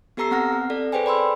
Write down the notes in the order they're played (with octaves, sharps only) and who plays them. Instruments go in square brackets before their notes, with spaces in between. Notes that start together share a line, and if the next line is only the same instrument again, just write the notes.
[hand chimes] B3 G4 A4 A#5 E6 C7
B3 C4 F#5 F6 A#6
C4
A4 D5
G#4 A4 B4 C5 G5 G#5
D5 B5 C6 E6